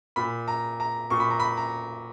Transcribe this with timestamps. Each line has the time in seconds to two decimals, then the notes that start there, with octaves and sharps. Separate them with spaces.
0.16 A#2 B5
0.48 A#5
0.80 A#5
1.10 A#2 C#6
1.20 B5
1.30 A#5
1.40 B5
1.57 A#5